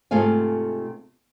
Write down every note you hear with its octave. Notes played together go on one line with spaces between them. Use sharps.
G#2 C3 A3 F4 F5 G#5